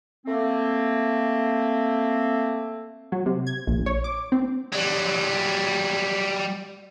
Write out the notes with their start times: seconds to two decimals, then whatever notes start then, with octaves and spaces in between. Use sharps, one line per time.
0.26 A3 A#3 C4
3.12 F#3
3.26 C3
3.47 G#6
3.67 A#1
3.86 C#5
4.04 D6
4.32 C4
4.73 F#3 G3